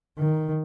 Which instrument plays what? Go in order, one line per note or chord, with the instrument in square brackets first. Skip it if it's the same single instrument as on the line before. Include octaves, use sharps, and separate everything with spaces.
[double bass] D#3